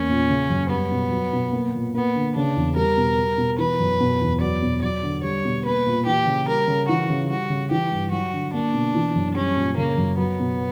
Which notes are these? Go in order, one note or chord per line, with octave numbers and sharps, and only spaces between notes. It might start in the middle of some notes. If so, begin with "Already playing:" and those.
Already playing: E2 A#3 C#4
A#2
C#3
F#2
G3 B3
B2
F#3
B2
A#3
A#2
A#3 B3
D3
C#3 D4
E2
G3 A#4
B2
G3
B2
E3 B4
F#2
B2
E2
F#3 D5
B2
F#3 D5
D3
G3 C#5
B2
A#3 B4
A#2
E3 G4
C#3
G3 A#4
C#3
E3 F#4
C#3
G3 F#4
C#3
E3 G4
G2
F#3 F#4
D3
A#3 D4
B2
E3
F#2
G3 C#4
A#2
C#3 A#3
F#2
F#3 B3
B2